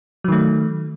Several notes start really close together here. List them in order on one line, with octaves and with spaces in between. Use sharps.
F#3 D#3 A3